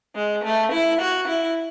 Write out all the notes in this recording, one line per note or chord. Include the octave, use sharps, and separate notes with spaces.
G#3
A3
E4
F#4
E4